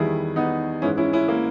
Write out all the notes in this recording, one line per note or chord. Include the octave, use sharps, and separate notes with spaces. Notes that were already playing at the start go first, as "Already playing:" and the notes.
Already playing: E2 D#3 G3 E4 G#4
B3 D#4
G#2 E3 G#3 C#4 E4
C#4 E4
C#4 E4
A#3